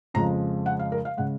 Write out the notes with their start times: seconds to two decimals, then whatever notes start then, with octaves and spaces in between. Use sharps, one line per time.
0.14 F2 C#3 F3 G#3 A#5
0.66 F#5
0.79 F5
0.92 A#4
1.05 F5
1.17 C#3 G#3 F#5